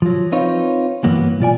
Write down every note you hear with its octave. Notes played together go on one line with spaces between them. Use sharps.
F3 F#3
C4 D#4 F4 B4 C#5
G2 E3 F#3 A#3 B3
B1 F4 D5 G#5